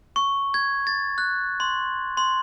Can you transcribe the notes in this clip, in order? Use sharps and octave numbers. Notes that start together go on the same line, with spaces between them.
C#6
G#6
A6
F#6
C6
C6